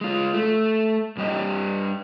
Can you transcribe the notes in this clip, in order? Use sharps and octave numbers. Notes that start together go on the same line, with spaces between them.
G#3 F4
A3
G2 G3 G4 D#5